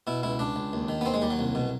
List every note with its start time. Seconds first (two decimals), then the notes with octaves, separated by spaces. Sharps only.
0.07 B2 E4
0.23 C#2 E4
0.39 C#2 D4
0.56 C#2
0.73 D#2
0.89 D#3
1.01 B3
1.05 D#2 C4
1.14 G#3
1.22 D#2 G3
1.30 F#3
1.39 C2
1.55 B2